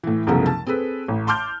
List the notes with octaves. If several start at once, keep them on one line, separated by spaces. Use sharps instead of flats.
A2 E3
C2 F#2 C#3 F3 A3 B3
A5
C4 G#4 A4 B4
A1
A5 C6 D6 F6 G6